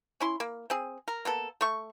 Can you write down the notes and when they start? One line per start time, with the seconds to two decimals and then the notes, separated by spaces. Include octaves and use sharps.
0.20 C#4 E4 C6
0.40 A#3
0.70 C4 G#4
1.08 A#4
1.25 A#3 B3 A4
1.61 A3 C#6